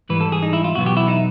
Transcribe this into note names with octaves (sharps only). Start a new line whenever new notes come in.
G#2 E3 G3 B4
A4
G#4
D#4
E4
F4
E2 B2 F#3 B3 F#4
G4
E4
D#4